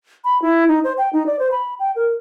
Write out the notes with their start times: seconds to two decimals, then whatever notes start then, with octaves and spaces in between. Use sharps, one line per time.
0.24 B5
0.42 E4
0.68 D#4
0.84 C5
0.98 G5
1.13 D#4
1.26 D5
1.39 C5
1.52 B5
1.79 G5
1.96 A#4